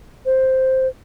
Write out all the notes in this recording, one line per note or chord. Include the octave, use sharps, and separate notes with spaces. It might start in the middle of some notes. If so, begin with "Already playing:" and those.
C5